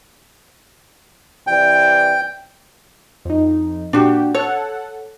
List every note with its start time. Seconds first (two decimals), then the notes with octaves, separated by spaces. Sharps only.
1.47 C3 E3 D5 G5
3.25 F2 D#4
3.93 A#2 D4 F#4 G4
4.35 A4 C#5 F#5